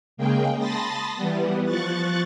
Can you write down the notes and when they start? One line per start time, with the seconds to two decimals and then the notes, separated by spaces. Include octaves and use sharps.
0.17 C#3 G#3 A#3 G#4 G5
0.57 A5 B5 C6 D#6 A6 A#6
1.15 E3 G3 B3
1.65 F3 C#6 F#6 A6